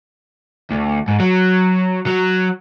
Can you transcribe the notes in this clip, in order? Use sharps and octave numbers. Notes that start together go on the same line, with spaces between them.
D2
G#2
F#3
F#3